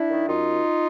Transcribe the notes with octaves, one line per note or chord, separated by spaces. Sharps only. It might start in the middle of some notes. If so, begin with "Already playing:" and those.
Already playing: D4 E4
D#3
F#2 D#4 F4